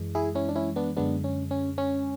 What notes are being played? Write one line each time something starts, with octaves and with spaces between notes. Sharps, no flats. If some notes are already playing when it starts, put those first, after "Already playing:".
Already playing: F#2 E3 G#3
E4 G#4
C#4 E4
D4
C#4 E4
B3 D4
F#2 D3 G#3 B3 D4
C#4
C#4
C#4